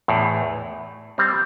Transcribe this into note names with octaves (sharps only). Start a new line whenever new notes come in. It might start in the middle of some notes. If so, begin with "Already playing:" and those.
E2 A2
G3 C4